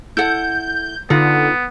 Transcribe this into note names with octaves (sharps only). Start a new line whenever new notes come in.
E4 A4 F#5 G6
D3 B3 D#4 F4 F#5